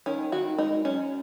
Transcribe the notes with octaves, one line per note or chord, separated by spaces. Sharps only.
D#3 C#4
D#3 F#4
G#2 D#4
F#2 C#4